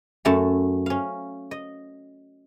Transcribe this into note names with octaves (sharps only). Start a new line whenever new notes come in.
F#2 A3 E5 A5 A#5 C6
C#4 F5
D#5